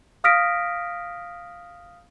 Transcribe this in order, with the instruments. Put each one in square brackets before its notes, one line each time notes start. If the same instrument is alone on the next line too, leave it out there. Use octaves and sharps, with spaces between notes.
[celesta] F5 D#6 F6 A#6 B6 D7